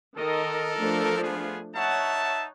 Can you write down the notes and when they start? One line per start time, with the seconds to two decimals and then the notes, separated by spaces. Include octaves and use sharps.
0.18 D#3 A4 A#4 D#5
0.79 F3 A3 D4
1.22 B3 F4 G#4
1.75 D#4 C#5 E5 F#5 A5